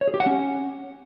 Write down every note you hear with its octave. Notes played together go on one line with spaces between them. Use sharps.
C#5
G#4
G4
F#5
C#4